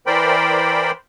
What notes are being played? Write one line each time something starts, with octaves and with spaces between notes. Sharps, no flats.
E3 A#4 C5 D5 G5 B5